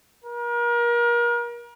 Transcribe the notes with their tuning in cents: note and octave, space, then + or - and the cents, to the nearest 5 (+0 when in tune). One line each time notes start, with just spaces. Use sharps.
A#4 +35